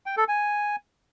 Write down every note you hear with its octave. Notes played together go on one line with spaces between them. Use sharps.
G5
A4
G#5